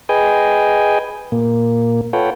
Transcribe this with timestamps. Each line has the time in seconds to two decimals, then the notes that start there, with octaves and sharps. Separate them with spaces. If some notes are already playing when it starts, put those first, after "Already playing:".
0.09 G#4 B4 D#5 G5 G#5
1.32 A#2 A#3
2.13 F4 A4 B4 C#5 F#5 G5